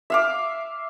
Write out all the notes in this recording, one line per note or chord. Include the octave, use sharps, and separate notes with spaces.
E5 F5 D6